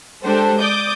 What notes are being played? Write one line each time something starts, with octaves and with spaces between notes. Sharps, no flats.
G#3 D4 G4 A4 C5
D5 D6 D#6 G6